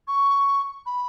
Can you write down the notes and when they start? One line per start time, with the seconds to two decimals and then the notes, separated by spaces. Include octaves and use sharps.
0.08 C#6
0.86 B5